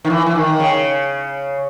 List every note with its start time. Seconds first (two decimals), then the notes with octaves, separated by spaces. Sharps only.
0.05 D#3
0.10 E3
0.26 E3
0.35 D#3
0.60 C#3